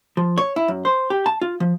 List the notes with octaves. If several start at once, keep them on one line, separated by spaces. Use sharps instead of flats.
F3
C#5
E4
F#2
C5
G4
A5
F4
F3